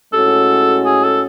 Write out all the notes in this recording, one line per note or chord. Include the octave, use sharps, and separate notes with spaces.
A2 G#3 C#4 F#4 A4
G#4
A4